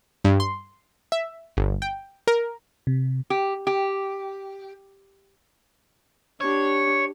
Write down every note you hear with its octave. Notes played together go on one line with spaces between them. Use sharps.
G2
C6
E5
G1
G5
A#4
C3
G4
G4
D4 G4 C#5